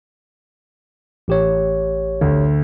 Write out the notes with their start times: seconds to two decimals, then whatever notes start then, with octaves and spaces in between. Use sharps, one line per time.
1.28 A1 G4 C#5
2.21 D2